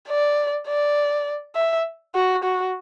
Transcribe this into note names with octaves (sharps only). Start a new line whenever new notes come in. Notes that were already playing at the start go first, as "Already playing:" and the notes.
D5
D5
E5
F#4
F#4